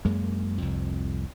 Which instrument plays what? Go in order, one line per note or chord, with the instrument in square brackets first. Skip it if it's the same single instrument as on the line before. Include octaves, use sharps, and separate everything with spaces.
[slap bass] F#2 G#3 A#3
C2 F2